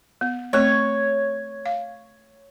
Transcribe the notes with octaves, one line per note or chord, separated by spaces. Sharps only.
B3
A3 C4 C#5
F5